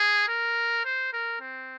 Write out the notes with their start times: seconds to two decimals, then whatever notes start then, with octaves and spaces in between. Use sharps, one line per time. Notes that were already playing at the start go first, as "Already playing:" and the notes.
Already playing: G#4
0.28 A#4
0.85 C5
1.13 A#4
1.41 C4